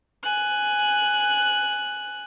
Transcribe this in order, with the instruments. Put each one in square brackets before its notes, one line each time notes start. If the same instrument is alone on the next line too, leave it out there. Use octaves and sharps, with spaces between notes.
[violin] G#5 F#6